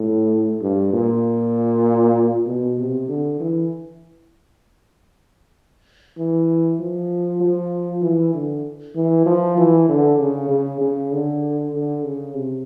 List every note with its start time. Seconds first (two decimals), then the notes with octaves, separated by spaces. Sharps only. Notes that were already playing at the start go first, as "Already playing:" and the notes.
Already playing: A2
0.62 G2
0.93 A#2
2.47 B2
2.79 C3
3.09 D3
3.40 E3
6.18 E3
6.80 F3
7.41 F3
8.02 E3
8.34 D3
8.95 E3
9.26 F3
9.57 E3
9.89 D3
10.19 C#3
10.50 C#3
10.81 C#3
11.12 D3
11.74 D3
12.04 C#3
12.34 C3